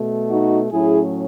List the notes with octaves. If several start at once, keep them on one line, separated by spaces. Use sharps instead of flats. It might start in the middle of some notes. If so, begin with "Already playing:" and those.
Already playing: B2 A3
D#4 F#4
A2 F#3 C#4 E4 G#4